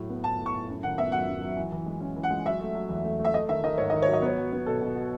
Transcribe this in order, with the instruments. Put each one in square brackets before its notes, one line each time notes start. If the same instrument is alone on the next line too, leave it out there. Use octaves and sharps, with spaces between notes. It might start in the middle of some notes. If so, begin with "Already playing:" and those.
Already playing: [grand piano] A2 F#3
B3
[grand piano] A2 [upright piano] A5
[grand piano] A2
[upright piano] C#6
[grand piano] A2
F#2
[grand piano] D#3 [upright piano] F#5
[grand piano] B3 [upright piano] E5
[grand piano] F#3 [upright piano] F#5
[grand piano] F#2
F#3
E3
E3
G#3
C#4
E3
[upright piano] F#5
[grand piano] G#3
[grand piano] F#3 [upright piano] E5
[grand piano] A3
F#3
E2
A3
A3
[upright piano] E5
[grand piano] A3 [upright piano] D#5
[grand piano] D#3 [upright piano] E5
[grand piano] D#3 [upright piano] D#5
[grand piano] G#2 [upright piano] C#5
[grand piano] D#3 [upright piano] D#5
[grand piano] F#3 [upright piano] C#5
[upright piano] D#5
[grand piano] B3 [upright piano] C#5
[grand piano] F#3
B3
[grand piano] B2 [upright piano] A4
[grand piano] B2
F#4